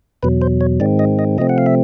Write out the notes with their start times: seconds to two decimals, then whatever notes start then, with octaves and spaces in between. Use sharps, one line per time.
0.23 E2 B2 F#3 B4
0.42 C5
0.61 C#5
0.80 G#2 D#3 G#3 C4 D5
0.99 D#5
1.19 D#5
1.38 C3 F3 A3 C4 D#5
1.49 F#5
1.58 F5
1.66 E5